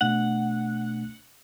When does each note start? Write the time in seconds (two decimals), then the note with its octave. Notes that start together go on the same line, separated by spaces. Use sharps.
0.01 B2 A3 D4 F#5